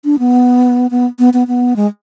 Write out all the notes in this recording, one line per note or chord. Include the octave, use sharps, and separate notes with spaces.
D4
B3
B3
B3
B3
B3
G#3